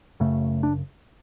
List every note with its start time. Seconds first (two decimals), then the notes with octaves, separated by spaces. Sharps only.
0.20 F#1 F#2 C#3 A3
0.63 D4